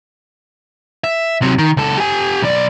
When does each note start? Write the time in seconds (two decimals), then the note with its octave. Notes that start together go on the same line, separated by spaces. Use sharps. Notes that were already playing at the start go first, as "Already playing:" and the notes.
1.04 E5
1.42 C3 F#3
1.59 D#3
1.77 C#2 A4
1.98 G4 G#5
2.42 B1 D5